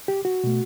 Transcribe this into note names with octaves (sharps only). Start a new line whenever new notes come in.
G4
F#4
B2 A3